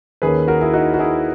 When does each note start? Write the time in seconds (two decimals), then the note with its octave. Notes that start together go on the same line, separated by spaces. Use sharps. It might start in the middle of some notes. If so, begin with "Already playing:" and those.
0.22 D#2 D#3 A#3 C#4 G#4 B4
0.47 F#4 A#4
0.61 E4 G#4
0.73 D#4 F#4
0.94 F#4
0.99 E4 G#4